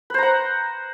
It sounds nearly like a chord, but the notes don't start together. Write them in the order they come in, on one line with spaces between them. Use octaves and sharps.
B4 C5 A#5 F#5